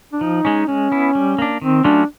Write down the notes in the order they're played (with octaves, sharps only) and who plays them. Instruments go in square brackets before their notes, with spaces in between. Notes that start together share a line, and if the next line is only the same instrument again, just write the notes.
[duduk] D4
[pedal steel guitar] F3 [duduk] D#4
[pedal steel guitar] G#3 C#4
[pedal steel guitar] G#3 [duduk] C#4
[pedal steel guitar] B3 E4
G3
A#3 D4
[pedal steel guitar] D#3 [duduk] C4
[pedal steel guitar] F#3 A3 C#4 F4 [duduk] D4